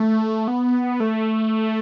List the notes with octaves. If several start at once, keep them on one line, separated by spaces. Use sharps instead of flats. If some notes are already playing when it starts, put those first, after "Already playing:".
Already playing: A3
B3
A3